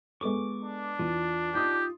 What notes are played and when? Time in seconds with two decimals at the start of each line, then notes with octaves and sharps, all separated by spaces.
0.21 G#3 B3 A4 C#6 D6
0.64 D4
0.99 E2 F4
1.55 D#4 F4 G4 D#6